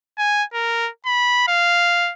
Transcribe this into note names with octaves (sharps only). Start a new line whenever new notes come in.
G#5
A#4
B5
F5